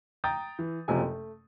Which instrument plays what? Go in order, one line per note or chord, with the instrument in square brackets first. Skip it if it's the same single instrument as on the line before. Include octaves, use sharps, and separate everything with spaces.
[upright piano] G5 A#5 D#6 G6 A6
E3
F#1 F#2 C3 F3 A3 G#5
A3